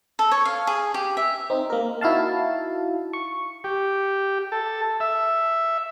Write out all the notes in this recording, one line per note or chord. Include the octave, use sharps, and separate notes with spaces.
A4
C#5
F5
G#4
G4
E5
C4 D#4
A#3 A#4
D#4 E4 F#4 F5 A5
C#6
G4
A4
E5